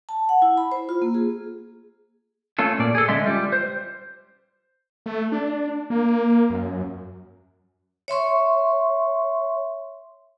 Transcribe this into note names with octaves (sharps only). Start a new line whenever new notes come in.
A5
F#5
E4
B5
C5
F4
A#3
G#4
A3 C#4 F4 A4
A#2 D5
G#4 A4
D3 G#3 C#4 D5 E5 C6
G3 F4
C5
A3
D4
A#3
F#2
C#5 E5 C6 C#6